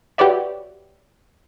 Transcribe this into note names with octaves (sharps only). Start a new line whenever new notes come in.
F#4 G4 B4 C#5 D5 E5